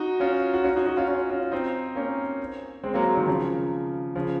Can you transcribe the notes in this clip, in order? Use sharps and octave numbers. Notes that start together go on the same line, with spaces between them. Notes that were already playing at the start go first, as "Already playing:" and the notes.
Already playing: D#4 F#4
C#4 F4
F#4
C#4 F4
D#4 F#4
D#4 F#4
C#4 F4
C#4 F4
C#4 F4
C4 D#4
A#3 C#4
G#3 C4
F#3 A#3
F#3 A#3
D#3 F#3
C#3 F3
C#3 F3